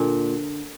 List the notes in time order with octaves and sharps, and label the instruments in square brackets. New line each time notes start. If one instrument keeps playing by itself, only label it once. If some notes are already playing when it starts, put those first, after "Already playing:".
Already playing: [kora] A#2 D3